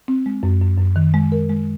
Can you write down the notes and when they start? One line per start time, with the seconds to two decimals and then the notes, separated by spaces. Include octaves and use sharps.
0.08 C4
0.26 G#3
0.43 F#2
0.61 F#2
0.78 F#2
0.96 D#3
1.14 G#3
1.32 A#4
1.49 G#3